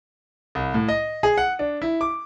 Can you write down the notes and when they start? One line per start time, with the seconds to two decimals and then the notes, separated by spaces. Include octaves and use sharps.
0.55 C2
0.74 A2
0.88 D#5
1.23 G#4
1.38 F#5
1.59 D4
1.82 E4
2.01 D6